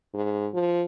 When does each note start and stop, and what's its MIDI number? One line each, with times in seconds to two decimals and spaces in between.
0.14 0.49 44
0.54 0.84 53